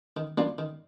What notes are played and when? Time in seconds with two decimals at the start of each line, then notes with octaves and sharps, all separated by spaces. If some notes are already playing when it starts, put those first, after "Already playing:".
0.17 D#3
0.38 G3 A#3 D4 F4
0.58 D#3